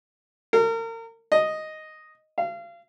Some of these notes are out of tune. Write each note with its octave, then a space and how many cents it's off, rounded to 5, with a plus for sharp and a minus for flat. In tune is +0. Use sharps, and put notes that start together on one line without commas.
A#4 -35
D#5 +0
F5 -30